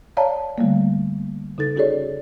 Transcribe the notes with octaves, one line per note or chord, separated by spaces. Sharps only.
C#5 D5 F5 A5 A#5
D3 G3 A3 A#3
C#3 D#4 A4 A6
C#4 F#4 G#4 A4 C#5 D5